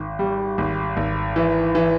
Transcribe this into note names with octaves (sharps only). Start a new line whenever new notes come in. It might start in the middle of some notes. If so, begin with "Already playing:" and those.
Already playing: G#1
G3
G#1
G#1
E3
E3